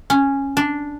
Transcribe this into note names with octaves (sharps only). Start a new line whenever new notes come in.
C#4
D4